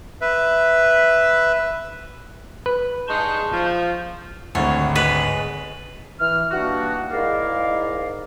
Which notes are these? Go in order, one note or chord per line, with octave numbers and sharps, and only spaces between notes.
B4 E5
B4
G2 G#3 D#4 A5 C6 C#6 G6
F3
G#1 D2 C#5
G#3 B4
E3 F6
E3 G3 A#3 D4 D#4 F#4
G#2 G#3 E4 A#4 D5 F5